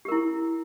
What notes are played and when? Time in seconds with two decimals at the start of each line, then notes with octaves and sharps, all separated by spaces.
0.05 G4
0.08 A#4
0.12 E4